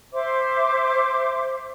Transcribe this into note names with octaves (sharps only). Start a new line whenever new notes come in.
C5 E5 C6 D6